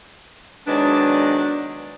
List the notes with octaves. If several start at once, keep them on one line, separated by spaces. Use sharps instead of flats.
D#3 F#3 G#3 B3 D4 D5